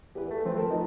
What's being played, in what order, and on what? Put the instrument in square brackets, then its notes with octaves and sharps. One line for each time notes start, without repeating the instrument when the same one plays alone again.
[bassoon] E2 [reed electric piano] G4 B4
[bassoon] A3 [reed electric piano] A4
[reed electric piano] F3 A3 B4 [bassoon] C4
[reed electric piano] A#4 A5
[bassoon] D#3 [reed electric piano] F4 D#5